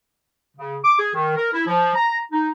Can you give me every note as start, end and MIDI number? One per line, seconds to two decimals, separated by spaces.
0.57 0.77 49
0.85 0.97 86
0.99 1.13 68
1.14 1.35 51
1.36 1.49 70
1.53 1.65 64
1.67 1.93 53
1.95 2.17 82
2.32 2.49 63